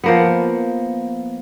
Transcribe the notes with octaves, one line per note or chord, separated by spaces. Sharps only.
F3 A#3 B3